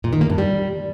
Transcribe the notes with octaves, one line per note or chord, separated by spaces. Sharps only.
A#2
D#3
A#3
G2
G3